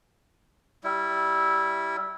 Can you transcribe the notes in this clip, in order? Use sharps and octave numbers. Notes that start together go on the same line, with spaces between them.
G3 E4